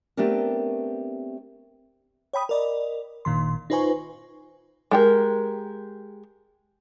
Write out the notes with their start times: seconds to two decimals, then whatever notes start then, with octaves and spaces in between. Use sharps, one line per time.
0.17 A3 B3 C4 D4 G4 A#4
2.33 C#5 G5 B5 D#6
2.49 A#4 D5 D#5
3.25 G1 A#2 D#3 C6
3.70 D#4 F4 B4 C5 G#5 C#6
4.91 G#3 G4 A#4